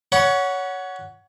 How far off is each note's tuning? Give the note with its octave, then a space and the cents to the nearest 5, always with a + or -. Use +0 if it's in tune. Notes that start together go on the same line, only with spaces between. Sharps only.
C#5 +20 F#5 +0 B5 -25